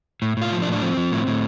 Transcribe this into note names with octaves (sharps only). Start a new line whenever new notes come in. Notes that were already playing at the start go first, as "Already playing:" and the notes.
A2
A2 F4
F3
D4
A2
D4
F3 C4
F3
A2
A2